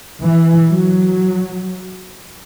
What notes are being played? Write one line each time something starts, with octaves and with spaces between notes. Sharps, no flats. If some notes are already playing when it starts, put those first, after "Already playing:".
E3
F#3